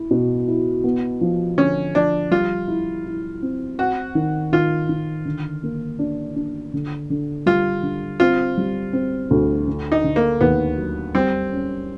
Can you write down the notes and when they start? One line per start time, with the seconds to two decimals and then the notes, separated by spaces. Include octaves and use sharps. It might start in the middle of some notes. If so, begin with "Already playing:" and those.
Already playing: E4
0.11 B2
0.48 E4
0.84 B3
1.21 F3
1.57 D3 C#4
1.95 F3 D4
2.31 G3 F4
2.68 E4
3.06 E4
3.42 C4
3.78 C4 F#4
4.15 D#3
4.52 D#3 F4
4.89 D#3
5.25 D3
5.63 A#3
5.99 D4
6.36 D4
6.74 D3
7.10 D3
7.46 G3 F4
7.83 D3
8.20 C4 F4
8.58 G3
8.93 C4
9.31 D2
9.68 D3
9.92 D#4
10.04 D3
10.16 A#3
10.41 D#2 B3
10.77 F#3
11.15 G3 C4
11.52 C#4